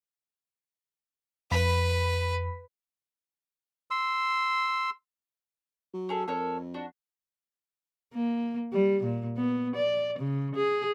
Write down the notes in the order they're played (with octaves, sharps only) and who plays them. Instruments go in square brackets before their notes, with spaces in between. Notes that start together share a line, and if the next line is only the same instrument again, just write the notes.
[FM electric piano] F2 B5 B6 [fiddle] B4
[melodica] C6 E6
[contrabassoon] F#3
[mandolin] C#4 G#4 A4
[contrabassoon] F2 [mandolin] A4 A#4 C#5
[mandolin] D4 F#4
[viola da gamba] A#3
G3
A#2
B3
D5
C#3
G#4